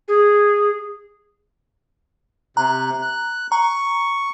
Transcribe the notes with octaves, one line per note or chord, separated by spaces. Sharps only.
G#4
C3 A#5 F#6
F#6
A#5 C#6